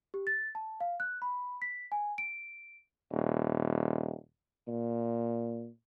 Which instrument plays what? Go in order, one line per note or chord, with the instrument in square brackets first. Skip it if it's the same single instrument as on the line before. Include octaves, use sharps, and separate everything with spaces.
[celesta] G4
A6
A5
F5
F#6
B5
B6
G#5
D7
[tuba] D#1
A#2